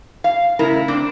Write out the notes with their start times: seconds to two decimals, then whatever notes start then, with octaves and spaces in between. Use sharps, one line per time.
0.24 F5
0.59 A2 C#3 E4 A#4 A#5
0.88 C4 D4